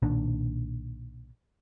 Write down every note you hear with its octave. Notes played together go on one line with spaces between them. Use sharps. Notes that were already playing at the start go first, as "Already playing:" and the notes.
B1 A#2 D#3 D4